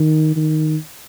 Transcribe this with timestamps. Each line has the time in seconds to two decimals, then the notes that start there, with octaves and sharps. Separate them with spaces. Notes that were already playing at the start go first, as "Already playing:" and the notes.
Already playing: D#3
0.36 D#3